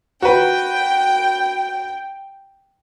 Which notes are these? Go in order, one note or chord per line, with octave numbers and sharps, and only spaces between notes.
F#4 B4 G5